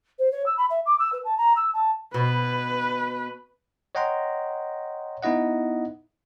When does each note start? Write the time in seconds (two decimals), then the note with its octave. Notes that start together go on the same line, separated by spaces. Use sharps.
0.19 C5
0.32 C#5
0.46 E6
0.57 B5
0.70 E5
0.86 D6
0.99 E6
1.13 B4
1.24 A5
1.38 A#5
1.56 E6
1.74 A5
2.14 B2 B4
3.95 C#5 D#5 F#5 G5 A#5 C6
5.22 B3 D#4 E4 D#5 F#5